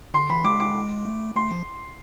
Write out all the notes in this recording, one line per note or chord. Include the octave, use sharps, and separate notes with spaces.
D3 C6
E3 B5
G#3 D6
D6
A3
A3 C6
F3